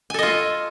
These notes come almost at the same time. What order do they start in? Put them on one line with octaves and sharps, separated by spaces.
G#5 A4 D#5 F4